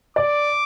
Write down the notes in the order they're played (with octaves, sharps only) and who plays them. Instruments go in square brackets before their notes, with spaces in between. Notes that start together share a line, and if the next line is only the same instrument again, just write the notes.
[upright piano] D5 [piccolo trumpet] D6